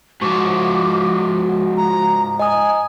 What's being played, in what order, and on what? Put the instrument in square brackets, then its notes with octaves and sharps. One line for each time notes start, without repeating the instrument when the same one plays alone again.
[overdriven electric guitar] G#2 F3 [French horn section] F#4 [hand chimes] C#6 [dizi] D6
[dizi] A#5
[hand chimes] D#5 A#5 D#6 [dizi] G#5